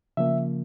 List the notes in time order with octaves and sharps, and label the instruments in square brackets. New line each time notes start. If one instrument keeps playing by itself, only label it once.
[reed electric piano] C#3 F3 A#3 E5